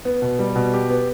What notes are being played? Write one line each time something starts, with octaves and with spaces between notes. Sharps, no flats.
B3
B2
G3
B2
G4
B3